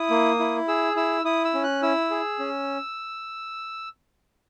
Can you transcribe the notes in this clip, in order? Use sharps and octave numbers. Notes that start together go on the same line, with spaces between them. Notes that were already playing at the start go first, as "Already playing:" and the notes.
Already playing: E4 D#6
A#3
E4
G#4 E6
E4 E6
E4 D#6
E6
C#4
F#6
E4 E6
G#4
C#4